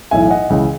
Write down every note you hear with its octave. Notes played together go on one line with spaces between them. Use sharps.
B1 A2 E3 E5 G#5
D#5 F#5
C#2 C#3 E3